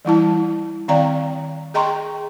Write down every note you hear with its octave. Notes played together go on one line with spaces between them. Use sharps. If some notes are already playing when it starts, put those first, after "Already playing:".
E3 G3 E4 A5
D#3 C4 D5 F5 G5 A#5
G#4 D#5 G5 A#5 C6 C#6